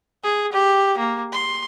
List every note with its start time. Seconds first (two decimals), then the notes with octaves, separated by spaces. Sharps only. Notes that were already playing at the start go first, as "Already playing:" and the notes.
0.24 G#4
0.53 G4
0.98 A#3
1.32 C6